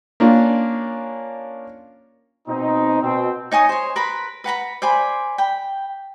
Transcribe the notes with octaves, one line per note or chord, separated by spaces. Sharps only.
A#3 C#4 D4 F4
B2 C4 D#4
B2 C4
D#4 C#5 G#5 D#6
C5 C#5
A#4 B4 B5 C6
B4 F#5 A#5 B5
C5 D5 G#5 B5
G5 B5